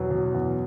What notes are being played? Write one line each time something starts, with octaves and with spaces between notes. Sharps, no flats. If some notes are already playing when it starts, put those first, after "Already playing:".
Already playing: E2 B2 F#3
B2
E2